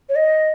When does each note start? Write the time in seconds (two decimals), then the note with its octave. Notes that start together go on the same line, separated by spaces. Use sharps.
0.09 C#5
0.15 D#5